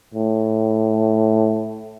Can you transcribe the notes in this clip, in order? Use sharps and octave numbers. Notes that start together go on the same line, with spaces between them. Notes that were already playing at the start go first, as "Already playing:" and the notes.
A2